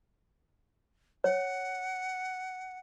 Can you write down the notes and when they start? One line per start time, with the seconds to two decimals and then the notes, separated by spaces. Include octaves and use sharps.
1.24 C#5 F#5